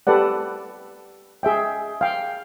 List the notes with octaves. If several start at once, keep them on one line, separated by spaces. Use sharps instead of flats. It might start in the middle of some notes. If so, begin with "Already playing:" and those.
G4 A4 B4 D5 F#5
G#4 E5 G5
F5 G5